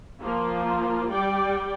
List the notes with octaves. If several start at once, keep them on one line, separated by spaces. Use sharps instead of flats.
F3 A#3 F4
G3 D5 G5